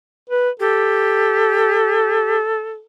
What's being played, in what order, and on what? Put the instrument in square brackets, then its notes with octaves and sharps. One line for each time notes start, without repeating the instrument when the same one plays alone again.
[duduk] B4
[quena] G4 [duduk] A4